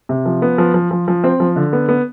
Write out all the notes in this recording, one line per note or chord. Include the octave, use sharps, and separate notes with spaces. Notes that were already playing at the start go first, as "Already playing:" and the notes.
C3
F3
B3
F3
F3
F3
F3
C4
F3
D3
B3
B3